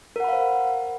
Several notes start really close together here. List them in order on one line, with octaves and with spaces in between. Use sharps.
A#4 F#5 B5 F5 C5